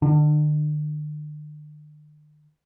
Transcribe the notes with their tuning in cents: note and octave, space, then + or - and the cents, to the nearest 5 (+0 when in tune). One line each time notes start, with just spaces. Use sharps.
D3 +45 D4 +25